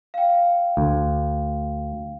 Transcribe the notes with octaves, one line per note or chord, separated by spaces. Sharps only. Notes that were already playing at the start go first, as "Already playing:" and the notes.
F5 G5
D2